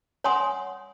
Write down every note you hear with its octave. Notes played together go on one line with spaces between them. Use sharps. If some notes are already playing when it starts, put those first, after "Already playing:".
C#5 F#5 G#5 C6 D#6